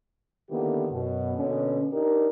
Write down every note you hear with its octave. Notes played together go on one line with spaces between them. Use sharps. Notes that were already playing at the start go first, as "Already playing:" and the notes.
D3 D#3 A#3 B3 E4 G4
F#2 B2
B2 D3 A#3 C#4
D4 D#4 G4 A#4